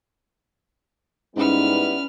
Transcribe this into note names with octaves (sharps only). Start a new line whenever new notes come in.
G#2 G3 B3 C#4 E4 B4 F6